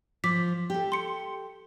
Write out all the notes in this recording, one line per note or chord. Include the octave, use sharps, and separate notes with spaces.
F3 D6 B6
G4 A4
C6 C#7